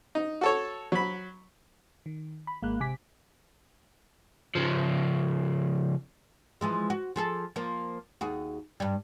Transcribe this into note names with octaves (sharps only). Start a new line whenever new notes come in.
D#4
F#4 A4 C#5
F#3 B5
D#3
B5
G#1 G#3 A#3 F#6
C3 G#5 D6 B6
C#3 F3
E3 F3 G#3
F#4
F3 G#4 A4
F3 A#3
D#2 F#4 G#4
G2 G3